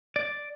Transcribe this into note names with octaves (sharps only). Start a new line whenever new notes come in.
D5